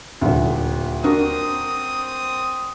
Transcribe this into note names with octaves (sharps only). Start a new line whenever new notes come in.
D#1 D2
C4 D4 F#4 A#4 D#6